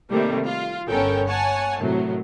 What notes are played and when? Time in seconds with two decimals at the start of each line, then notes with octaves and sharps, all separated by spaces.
0.11 C3 D#3 G3 A3 A#3
0.45 F4
0.89 G1 B3 C#4 A4 A#4 G5
1.26 C#5 F#5 G#5 A5
1.79 A2 C3 D#3 F#3 A3